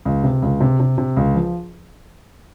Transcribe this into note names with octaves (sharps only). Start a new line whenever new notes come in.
C#2
C3
C#2
C3
C3
C3
C#2
F3